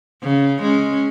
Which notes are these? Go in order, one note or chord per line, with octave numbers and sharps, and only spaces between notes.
C#3
G#3 C#4